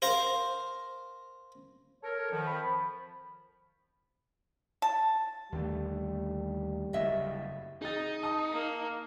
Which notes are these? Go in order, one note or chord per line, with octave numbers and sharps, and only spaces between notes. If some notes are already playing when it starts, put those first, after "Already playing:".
A#4 C5 F5 A#5
A4 A#4 C#5
F2 D#3 F3
B5
A5
D#2 D3 G3 A3
F#1 F2 A2 D#5 E5
D#4 G#4 A6
A5 D#6
A#3